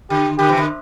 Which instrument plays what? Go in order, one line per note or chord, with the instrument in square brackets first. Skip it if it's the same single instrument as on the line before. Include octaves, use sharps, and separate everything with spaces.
[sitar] D3 [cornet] G4
[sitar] D3 [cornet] G4
[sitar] C3 E3
D3